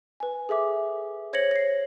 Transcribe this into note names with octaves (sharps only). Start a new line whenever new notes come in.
B4 G#5
G#4 A4 E5 D6
C5 C#5 G#6 A#6 C#7 F#7
A#6 C7